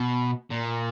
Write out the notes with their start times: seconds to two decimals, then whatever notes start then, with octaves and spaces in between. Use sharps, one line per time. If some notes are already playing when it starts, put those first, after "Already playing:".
Already playing: B2
0.50 A#2